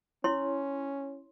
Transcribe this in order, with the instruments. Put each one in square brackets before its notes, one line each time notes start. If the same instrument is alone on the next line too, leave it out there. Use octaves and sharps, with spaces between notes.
[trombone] C#4 [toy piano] E4 C#5 C6